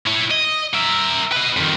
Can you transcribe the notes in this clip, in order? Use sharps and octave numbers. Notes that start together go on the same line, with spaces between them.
E4 C#5
D#5
A#4 E5
B4 D#5
F2 D#3